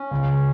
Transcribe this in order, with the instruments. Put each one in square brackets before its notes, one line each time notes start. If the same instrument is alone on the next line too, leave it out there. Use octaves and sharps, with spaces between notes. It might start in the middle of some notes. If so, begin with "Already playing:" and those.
Already playing: [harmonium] C#4
[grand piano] C#2